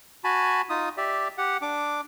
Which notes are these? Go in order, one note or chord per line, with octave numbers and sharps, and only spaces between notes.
F#4 G#5 A5 B5
D#4 F4 D#6
G4 D5 E5
G4 F#5
D4 D6